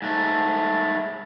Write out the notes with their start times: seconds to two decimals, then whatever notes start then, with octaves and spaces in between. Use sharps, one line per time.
0.02 G#2 A3